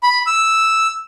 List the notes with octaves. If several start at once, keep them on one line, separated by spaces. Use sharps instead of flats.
B5
E6